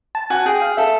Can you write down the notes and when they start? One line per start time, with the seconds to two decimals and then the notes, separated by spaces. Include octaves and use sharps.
0.15 A5
0.30 F#4 G#5
0.46 G#4 G5
0.62 F5
0.77 A4 E5